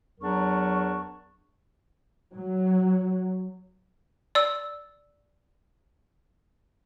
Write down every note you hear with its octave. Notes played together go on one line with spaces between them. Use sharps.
E2 F#3 D4 A#4 C#6
F#3
D5 E6